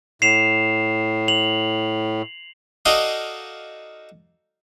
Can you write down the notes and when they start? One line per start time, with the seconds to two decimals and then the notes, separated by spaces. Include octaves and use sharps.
0.22 A2 C7 E7 F7
1.28 F7 F#7
2.85 D#4 F#4 A4 D5 D#5 F5